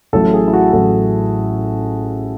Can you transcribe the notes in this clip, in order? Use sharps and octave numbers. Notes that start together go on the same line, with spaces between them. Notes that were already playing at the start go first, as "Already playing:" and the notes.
A1 A2 F#3 A4
G#4
E4
F#4
A1 A2 F#3 A4